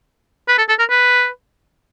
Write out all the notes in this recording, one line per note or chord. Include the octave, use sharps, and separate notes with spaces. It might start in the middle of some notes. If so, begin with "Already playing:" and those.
B4
A4
A4
A#4
B4